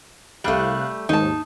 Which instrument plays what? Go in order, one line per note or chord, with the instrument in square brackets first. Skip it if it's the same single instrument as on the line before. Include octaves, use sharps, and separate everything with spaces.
[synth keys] C2 F5 F#6 [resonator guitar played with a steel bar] G3 A3
[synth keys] D#2 G#2 [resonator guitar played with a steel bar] D#4 A5